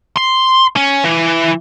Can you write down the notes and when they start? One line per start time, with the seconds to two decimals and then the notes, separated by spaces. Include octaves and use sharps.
0.17 C6
0.77 C#4
1.05 E3